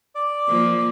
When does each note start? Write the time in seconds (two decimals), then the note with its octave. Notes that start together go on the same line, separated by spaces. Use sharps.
0.15 D5
0.48 F3 A#3